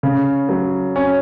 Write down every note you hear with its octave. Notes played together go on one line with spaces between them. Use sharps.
C#3
F#3
C#4